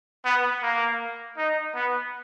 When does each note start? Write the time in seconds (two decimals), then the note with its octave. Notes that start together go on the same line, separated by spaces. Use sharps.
0.25 B3
0.62 A#3
1.38 D#4
1.75 B3